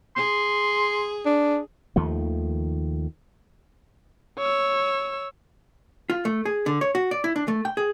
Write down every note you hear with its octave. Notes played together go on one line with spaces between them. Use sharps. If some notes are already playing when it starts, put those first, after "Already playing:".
G#4 C6
D4
D#2 D#3 F3 A3
C#5 E6
F4
A3
G#4
D3
C#5
F#4
D5
E4
D4
A3
G5
G#4